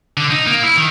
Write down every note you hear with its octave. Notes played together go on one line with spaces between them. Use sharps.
D3
D#4
A#3
E4
D#3